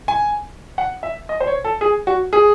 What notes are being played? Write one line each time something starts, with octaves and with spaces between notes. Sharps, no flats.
G#5
F#5
E5
D#5
C5
C#5
A4
G#4
F#4
G#4